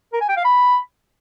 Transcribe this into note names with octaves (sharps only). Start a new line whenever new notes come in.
A#4
G#5
G5
F5
B5